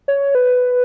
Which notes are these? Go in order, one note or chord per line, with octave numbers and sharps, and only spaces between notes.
C#5
B4